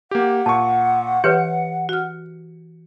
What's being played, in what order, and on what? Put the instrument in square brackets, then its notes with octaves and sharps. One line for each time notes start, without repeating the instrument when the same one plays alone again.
[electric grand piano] A#3 G4 [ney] F#5
[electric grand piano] A#2 C#6 [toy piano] A5
[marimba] E3 [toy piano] G4 B4 C#5 [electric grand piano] C#7
[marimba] F#4 F6